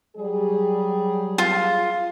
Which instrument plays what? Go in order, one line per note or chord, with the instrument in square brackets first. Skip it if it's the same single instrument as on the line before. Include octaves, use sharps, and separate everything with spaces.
[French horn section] F#3 G3 G#4
[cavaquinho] F4